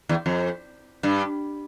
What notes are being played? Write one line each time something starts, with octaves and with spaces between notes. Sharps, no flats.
E2
F2
G2